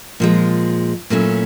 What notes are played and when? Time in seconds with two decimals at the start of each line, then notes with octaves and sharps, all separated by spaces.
0.20 A#2 F3 G#3
1.10 A#2 F#3 A3 C#4 E4